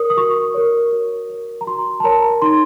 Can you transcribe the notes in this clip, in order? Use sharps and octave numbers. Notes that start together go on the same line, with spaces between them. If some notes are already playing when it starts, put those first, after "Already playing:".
Already playing: A#4 C#5 D#6
D#6
F#4 C#6
A#4 C#5
F#4
A#4 C#5
A#5
F#4 C6
A5
A#4 C#5 A#5
D#4 C6